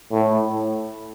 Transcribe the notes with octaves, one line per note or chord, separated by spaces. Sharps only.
A2